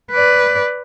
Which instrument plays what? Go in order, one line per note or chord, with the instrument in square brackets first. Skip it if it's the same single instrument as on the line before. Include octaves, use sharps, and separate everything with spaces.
[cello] B4 D5